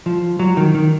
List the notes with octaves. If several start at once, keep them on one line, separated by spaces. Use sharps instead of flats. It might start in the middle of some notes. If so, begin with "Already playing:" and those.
F3
F#3
D#3
D#3